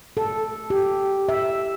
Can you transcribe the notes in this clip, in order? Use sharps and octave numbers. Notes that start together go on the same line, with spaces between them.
A4
G4
E5